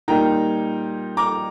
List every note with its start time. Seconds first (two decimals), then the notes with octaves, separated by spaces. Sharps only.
0.08 A#2 G3 A#3 D#4 G5 A#5
1.17 A#5 D6